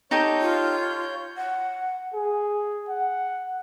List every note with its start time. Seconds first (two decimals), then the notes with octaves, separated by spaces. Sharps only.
0.11 D#4 G4 A4 C#5 G6
0.41 F4
1.37 F#5
2.14 G#4
2.89 F#5